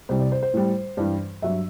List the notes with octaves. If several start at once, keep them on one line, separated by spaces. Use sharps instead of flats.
C2 C3 G3 C5
D5
C5
C5
A2 G3
G2 E3 G3
G2 F#3 E5